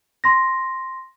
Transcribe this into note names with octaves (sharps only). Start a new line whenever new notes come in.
C6 A#6